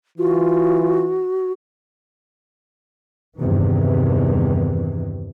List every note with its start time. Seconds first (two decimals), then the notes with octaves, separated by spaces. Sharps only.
0.18 E3 F4 F#4
3.37 E2 G2 C3 D#3 E3